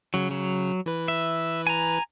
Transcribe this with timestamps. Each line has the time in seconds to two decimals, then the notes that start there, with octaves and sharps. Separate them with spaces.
0.14 C#3 F#3
0.31 F#3
0.86 E3 B4
1.08 E5
1.67 G#5 A#5